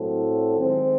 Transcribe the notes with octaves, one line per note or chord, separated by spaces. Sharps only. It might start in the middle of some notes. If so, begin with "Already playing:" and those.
Already playing: A2 F#3 C4 E4 A4
D#3 G#3 C4